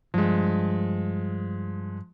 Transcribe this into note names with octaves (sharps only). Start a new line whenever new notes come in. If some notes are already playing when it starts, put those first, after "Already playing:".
G2 F3 G#3